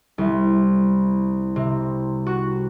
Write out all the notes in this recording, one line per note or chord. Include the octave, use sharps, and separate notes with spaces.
C2
C3
F#4